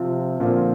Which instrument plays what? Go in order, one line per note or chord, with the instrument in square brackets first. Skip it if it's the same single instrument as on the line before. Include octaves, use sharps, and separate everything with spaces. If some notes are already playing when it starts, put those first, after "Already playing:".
Already playing: [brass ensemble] C3 [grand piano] F3 C4 F4
[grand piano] A#2 F3 C4 F4 [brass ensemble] D3